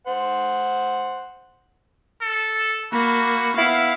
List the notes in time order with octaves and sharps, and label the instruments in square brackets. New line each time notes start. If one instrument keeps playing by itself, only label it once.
[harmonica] C5 F#5
[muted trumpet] A4
[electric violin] A#3 [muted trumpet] F#4 [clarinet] B5
[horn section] B3 E4 [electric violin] F5